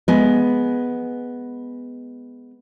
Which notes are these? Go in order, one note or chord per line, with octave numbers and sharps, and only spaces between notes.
G#3 B3